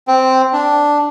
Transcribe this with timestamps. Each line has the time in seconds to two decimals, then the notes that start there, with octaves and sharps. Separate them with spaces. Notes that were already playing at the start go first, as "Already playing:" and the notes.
0.08 C4
0.53 D4